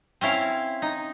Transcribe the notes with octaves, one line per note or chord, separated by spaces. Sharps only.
C4 C#4 E4 F5
D#4